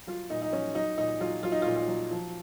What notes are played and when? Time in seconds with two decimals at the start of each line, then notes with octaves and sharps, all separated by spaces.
0.07 F#3 F4
0.30 A#2 D#4
0.42 D#4
0.52 F#3 C#4
0.75 F#3 D#4
0.98 A#2 D#4
1.21 F#3 F4
1.43 F#3 F4
1.52 D#4
1.62 A#2 F4
1.76 F4
1.88 F#3
2.11 F3